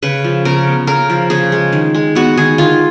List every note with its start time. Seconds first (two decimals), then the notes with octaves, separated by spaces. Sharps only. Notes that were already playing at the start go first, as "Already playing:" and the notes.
0.03 C#3 B4
0.24 F3
0.45 C#3 A#4
0.67 B3
0.87 C#3 A#4
1.10 F3
1.30 C#3 G#4
1.52 G#3
1.73 D#3
1.95 G#3
2.15 B3 F#4
2.37 D#3 G#4
2.58 D#3 F4